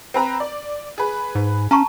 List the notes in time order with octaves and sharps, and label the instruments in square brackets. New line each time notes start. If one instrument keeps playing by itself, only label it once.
[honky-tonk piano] C4 B4 A#5
D5
G#4 B4
[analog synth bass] G#2
[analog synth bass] C#4 [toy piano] A5 A#5 C#6